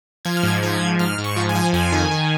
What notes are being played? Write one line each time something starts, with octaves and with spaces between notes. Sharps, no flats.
F3 G#6
F6
G#2 G#6
F3 G#6
G#2
G#2 F6
G#2
C#6
F3
G#5
F3
F2 G#5
D#3
D#3